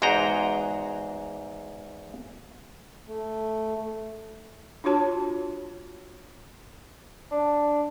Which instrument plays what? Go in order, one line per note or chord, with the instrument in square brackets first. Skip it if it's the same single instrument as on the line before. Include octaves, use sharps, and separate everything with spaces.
[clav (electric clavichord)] E2 G#2 F#4 G#4 G5 A#5
[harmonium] A3
[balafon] D4 F4 F#4 C#5 A5
[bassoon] D4